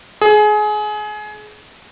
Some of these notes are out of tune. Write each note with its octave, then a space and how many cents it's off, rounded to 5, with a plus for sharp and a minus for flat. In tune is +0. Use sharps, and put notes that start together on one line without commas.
G#4 +25